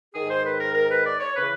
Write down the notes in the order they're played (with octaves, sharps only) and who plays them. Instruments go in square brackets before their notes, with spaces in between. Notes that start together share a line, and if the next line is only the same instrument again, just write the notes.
[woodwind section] G#2 D#3 G#4
C5
B4
A#4
A#4
B4
D5
C#5
C#3 E3 B4